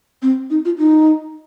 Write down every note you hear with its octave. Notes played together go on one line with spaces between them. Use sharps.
C4
D#4
F4
D#4